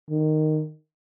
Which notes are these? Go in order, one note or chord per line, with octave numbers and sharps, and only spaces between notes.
D#3